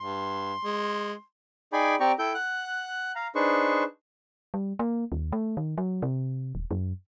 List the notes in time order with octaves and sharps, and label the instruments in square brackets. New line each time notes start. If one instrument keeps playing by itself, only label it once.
[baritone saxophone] G2 [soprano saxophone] C6
[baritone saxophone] G#3
[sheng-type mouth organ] D#4 G#4 D5 G5 G#5 B5
C4 G4 D5 G5 A#5 C#6
E4 A4 G5 G6
F#5 F#6
F5 A#5
D4 D#4 G#4 B4 C5 C#6
[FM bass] G3
A#3
D#2
A3
D#3
F#3
C3
D#1
F#2